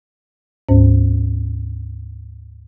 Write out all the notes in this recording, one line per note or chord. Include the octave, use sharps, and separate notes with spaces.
D2 G#2 C#4 C5